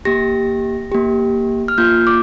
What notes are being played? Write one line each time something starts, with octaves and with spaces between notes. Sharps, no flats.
A#3 G4 A#6
A#3 G4
F6
A#3 F4 G6
D6